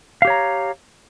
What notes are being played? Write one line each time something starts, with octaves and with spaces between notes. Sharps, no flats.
G4 C#5 F5 A#5